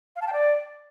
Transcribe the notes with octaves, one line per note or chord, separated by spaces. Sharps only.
F5
A5
G5
D5